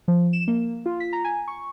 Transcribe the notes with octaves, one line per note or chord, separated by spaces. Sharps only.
F3
E7
A#3
F4
B6
A#5
G#5
C#6